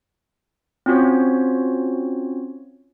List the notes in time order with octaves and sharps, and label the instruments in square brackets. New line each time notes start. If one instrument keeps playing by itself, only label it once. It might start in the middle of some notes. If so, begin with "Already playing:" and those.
[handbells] C4 C#4 F4 F#4 C5 C#5